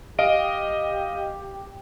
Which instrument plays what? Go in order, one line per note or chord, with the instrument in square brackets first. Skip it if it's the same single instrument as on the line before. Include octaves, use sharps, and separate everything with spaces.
[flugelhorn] G4 [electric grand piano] D#5 F5 D7